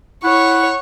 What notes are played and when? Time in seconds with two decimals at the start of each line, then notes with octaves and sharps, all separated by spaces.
0.24 E4 C#5 F#5 C#6